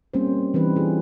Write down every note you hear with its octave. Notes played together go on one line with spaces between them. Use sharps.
G3 A#3 C4 C#4 C5
E3 G3 C4 D#4 B4
F4 G#4